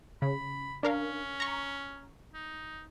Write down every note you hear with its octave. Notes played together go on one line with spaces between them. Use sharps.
C#3 B5
C#4 D4 A#4 F5
A#5 C#6
D#4